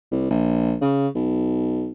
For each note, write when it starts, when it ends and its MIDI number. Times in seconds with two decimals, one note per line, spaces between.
0.11 0.26 36
0.30 0.74 34
0.81 1.08 49
1.15 1.91 35